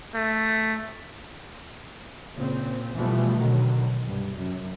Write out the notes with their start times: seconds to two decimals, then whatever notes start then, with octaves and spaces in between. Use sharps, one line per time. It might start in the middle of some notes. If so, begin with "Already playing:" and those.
0.15 A3
2.35 A#2 C#3 C4
2.95 B2 E3 F3 G3 A3 B3
3.37 B2 D3 D#3 F#3
4.04 C2 G2
4.36 F#2